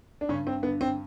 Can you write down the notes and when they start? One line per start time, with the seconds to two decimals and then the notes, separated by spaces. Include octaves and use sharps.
0.21 D4
0.29 G2 C#3 C#4
0.47 C4
0.63 D3 B3
0.81 C4